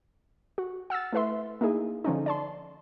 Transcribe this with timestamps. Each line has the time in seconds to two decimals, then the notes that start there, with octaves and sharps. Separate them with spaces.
0.58 F#4
0.90 F#5 E6 F6 A6
1.13 A3 E4 B4 E5 C6
1.61 A#3 D#4 E4 G#4
2.04 D3 F3 C#4 D#4
2.26 D5 A5 C6